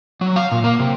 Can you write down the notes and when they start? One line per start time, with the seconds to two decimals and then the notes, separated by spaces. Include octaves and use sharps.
0.21 F#3
0.36 F5
0.52 A#2
0.64 A#3
0.80 C3